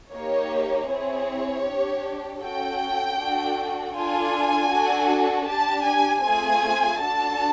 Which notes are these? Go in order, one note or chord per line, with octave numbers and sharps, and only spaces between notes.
A#3 D#4 G4 C#5
C4 E4 G#4 C#5
D4 G4
C#4 F#4 A4 G5
D4 F#4 A4
D4 F4 A4 G#5
D4 F#4 A4
D4 G4 A5
G#5
A3 C4 F4 G#4 G#5
D4 F#4 A4 A5